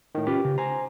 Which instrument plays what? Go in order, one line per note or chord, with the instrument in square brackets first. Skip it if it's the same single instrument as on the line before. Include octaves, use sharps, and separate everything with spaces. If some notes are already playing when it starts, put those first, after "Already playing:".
[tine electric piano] A2 D#3
[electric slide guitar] C#4 F4 B4 [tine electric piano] G4
[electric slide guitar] C#3
[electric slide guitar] C5 G#5 [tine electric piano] A#5